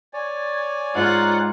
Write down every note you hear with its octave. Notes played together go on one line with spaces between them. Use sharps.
C#5 D5 G#5
G#2 F4 C5 F#5 A#5